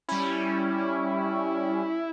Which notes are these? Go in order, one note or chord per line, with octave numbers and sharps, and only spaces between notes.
G3 C#4 E4